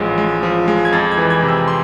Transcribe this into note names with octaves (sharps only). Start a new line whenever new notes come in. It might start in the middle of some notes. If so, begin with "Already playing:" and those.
Already playing: A1 F3 G#3
G#3
F3
G#3
G#6
F2 A6
G#6
E3
G#6
C3
E6
C6